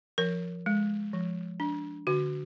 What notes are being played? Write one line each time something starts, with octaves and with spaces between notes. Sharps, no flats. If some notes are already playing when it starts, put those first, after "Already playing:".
F3 A#4
G#3
F3
D4
D3 F#4